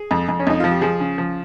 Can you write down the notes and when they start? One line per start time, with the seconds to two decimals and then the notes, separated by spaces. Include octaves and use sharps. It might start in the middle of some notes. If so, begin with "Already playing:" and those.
Already playing: G#4
0.11 F2
0.29 F2
0.40 C#4
0.47 F2 D#4
0.60 F3 F4
0.71 G4
0.81 F3 G#4
1.00 C#3
1.18 F3